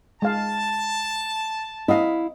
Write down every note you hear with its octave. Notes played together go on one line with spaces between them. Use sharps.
G#3 F5 A5
C4 E4 D#5 F5 F#5